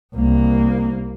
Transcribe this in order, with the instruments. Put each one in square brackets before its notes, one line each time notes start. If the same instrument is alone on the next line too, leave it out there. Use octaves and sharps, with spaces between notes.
[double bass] C2 A#3